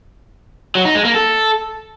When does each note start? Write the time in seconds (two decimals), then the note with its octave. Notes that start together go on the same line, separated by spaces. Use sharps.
0.75 F#3
0.85 D#4
0.95 G#3
1.05 A#3
1.15 A4